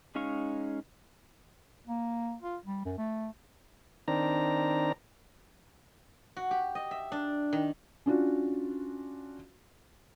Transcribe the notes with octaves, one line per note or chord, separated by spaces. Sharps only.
G#3 C#4 D#4 F5 C#6
A#3
F4
G3
F#2
A3
D#3 C4 D4 A#5
F#4
G4
D#5
E5
D4
D#3
C#4 D4 F4 F#4